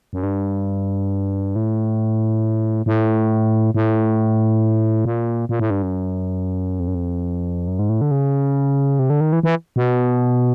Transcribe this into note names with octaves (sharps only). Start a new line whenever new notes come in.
F#2
G2
A2
A2
A2
A#2
A#2
A2
G2
F#2
F2
F#2
F2
F#2
G#2
A2
D3
C#3
C3
D3
D#3
E3
E3
B2